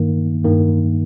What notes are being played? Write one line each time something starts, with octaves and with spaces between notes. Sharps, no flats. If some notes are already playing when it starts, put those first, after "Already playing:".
Already playing: G2 D#3 A#3
G2 D#3 A#3